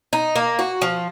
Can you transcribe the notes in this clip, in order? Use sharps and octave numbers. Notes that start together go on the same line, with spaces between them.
D#4
A#3
F#4
F3